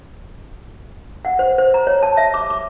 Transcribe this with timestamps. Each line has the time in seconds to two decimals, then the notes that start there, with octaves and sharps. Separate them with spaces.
1.25 F#5
1.39 C5
1.58 C5
1.74 A#5
1.87 C#5
2.03 A5
2.17 E5
2.34 D6
2.50 D6